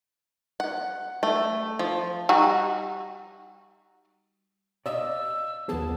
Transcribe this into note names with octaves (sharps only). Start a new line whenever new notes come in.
F#5
A3
F3
G3 D#4 F#4
D5 D#5 F5 E6
D#2 F3 B3 G#4 A5